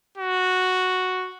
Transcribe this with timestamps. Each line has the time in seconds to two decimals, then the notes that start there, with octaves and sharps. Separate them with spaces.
0.18 F#4